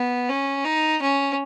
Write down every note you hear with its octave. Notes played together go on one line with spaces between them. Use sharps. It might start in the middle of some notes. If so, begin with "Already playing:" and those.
Already playing: B3
C#4
D#4
C#4